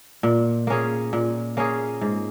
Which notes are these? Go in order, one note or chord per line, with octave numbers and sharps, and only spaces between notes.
A#2
A#3 C#4 G#4
A#2
A#3 C#4 G#4
G#2